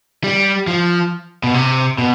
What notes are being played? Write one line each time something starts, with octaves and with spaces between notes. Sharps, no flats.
G3
F3
B2
C3
B2